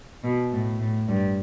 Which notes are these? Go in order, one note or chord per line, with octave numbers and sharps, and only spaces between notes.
B2
A2
A2
G2